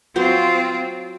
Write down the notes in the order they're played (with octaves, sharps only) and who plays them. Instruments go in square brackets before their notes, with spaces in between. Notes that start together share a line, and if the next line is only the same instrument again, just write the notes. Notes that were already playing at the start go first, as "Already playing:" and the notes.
[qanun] F#3 F#4 C5 [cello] C4 F4